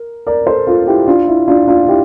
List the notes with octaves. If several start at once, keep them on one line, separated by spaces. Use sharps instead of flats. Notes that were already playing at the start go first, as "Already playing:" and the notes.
Already playing: A#4
A#4 D5
A4 C5
F4 A4
E4 G4
D4 F4
E4
D4 F4
D4 F4
E4 G4